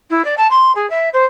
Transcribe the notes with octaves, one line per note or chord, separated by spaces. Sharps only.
E4
D5
A5
C6
G#4
E5
C5